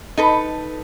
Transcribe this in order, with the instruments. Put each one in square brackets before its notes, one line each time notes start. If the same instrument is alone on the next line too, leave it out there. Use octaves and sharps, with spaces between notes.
[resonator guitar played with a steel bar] D#4 A4 B4